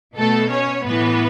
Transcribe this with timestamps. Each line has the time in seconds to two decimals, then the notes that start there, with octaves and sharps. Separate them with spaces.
0.17 B2 A3 A4
0.50 C#4 C#5
0.85 A2 E3 B3 B4